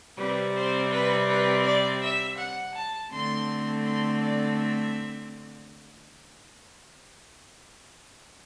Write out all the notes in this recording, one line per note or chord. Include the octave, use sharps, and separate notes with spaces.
C3 G3 C4 B4
C5
B4
B4
D5
E5
F#5
A5
D3 A3 C4 C6
C6
D5
E5